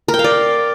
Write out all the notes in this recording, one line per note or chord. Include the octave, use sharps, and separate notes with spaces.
A#4
G5
F5
D5